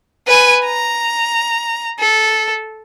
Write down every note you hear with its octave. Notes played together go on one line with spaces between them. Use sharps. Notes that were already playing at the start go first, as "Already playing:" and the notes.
B4 G#5
A#5
A4